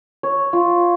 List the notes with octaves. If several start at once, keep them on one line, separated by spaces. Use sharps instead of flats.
C#5
F4